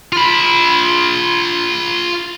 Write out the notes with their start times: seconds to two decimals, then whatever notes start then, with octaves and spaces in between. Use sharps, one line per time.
0.12 F4 B5